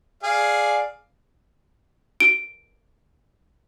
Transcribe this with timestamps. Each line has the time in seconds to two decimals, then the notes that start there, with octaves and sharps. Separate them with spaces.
0.23 G#4 D5 F5
2.20 D7